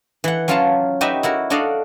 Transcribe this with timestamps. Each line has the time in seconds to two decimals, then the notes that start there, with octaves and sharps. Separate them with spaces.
0.24 E3 F#5
0.48 F#3 C#4 F4 C#5 F5 A5
1.01 D#4 F#4 G4 B4 D#5 E5
1.23 E4 F#4 A#4
1.50 D4 F#4 A4 D5 D#5 F5